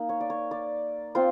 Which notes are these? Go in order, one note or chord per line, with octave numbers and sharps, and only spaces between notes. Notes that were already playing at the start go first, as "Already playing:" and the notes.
Already playing: A#3 D#4
C#5
D5
C#5
D5
C4 F4 C5